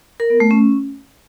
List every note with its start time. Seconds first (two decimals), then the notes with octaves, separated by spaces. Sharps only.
0.20 A#4
0.30 B3
0.40 A3
0.51 C#4